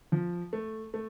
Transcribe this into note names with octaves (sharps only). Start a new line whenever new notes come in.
F3
A3
A3